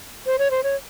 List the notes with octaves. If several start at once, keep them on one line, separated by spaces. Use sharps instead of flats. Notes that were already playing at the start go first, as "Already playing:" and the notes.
C5
C#5
C5
C#5